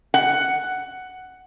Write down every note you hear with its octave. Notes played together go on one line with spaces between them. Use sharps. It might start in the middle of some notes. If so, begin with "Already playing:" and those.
F#5